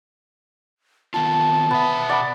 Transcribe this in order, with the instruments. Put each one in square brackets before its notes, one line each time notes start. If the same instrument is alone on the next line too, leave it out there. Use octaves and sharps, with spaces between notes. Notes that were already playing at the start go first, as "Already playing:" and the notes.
[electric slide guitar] D#3 B3 F4 [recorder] A5
[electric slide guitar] B2 E5 [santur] B3
[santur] D5 F#5 B5